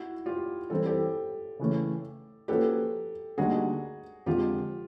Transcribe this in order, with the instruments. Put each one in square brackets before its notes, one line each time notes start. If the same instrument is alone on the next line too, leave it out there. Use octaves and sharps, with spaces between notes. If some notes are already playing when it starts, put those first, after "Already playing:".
Already playing: [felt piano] E4 F#4
F4 G4
[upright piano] E3 G3 C4 E4 [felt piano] A4
[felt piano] G4 A4
[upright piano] C#3 E3 A3 C#4
[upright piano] F3 A#3 C#4 F#4 B4 [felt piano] G4 A4
[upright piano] D2 D3 G3 A#3 D#4 [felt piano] F#4 G#4
[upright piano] F2 D3 F3 G#3 [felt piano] F4 G4